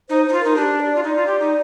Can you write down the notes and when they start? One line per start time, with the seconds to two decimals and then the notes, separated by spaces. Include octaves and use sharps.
0.09 D#4 C5
0.24 D#4 C5
0.32 F4
0.40 D#4 A#4
0.56 D4 G4
0.80 D5
0.96 F4
1.03 D#4 D5
1.16 F4
1.27 G4
1.39 D#4